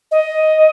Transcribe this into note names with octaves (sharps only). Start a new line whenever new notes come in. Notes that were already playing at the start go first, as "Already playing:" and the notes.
D#5